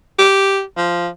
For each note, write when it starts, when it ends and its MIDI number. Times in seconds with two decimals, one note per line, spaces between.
0.19 0.62 67
0.77 1.09 53